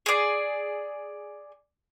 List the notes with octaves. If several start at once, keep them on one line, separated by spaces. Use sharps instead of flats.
G#4 D5